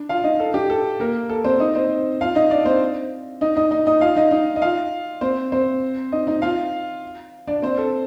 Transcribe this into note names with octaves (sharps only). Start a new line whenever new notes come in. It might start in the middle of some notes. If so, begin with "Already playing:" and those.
Already playing: D4
F4 F5
D#4 D#5
A4
G4
A4
A#3 A#4
A4
C4 C5
D#4 D#5
C4 C5
F4 F5
D#4 D#5
D4 D5
C4 C5
D#4 D#5
D#4 D#5
D#4 D#5
D#4 D#5
F4 F5
D#4 D#5
D#4 D#5
D#5
F4 F5
C4 C5
C4 C5
D#4 D#5
D#4 D#5
F4 F5
D4 D5
C4 C5
A4